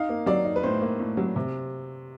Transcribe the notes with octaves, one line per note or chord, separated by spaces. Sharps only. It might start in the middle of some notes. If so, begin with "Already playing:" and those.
Already playing: D#4 F5
A#3
F#3 D5
D#4
B4
A2 C5
A#3
A2
F#3
C3